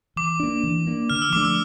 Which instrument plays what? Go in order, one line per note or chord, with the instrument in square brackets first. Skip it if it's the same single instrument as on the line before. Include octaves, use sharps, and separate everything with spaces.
[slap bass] E3 [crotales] D6
[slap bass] A#3 D4
E3
A#3 D4
[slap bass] D3 [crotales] F6
[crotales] E6
[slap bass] F3 A3 D4 [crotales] D6
[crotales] E6